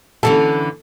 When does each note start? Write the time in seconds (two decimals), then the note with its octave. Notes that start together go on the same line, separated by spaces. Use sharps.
0.23 D3 E3 C#4 A4